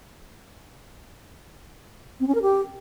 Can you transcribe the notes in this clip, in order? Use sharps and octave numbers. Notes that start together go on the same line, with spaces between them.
C4
C#4
A#4
G4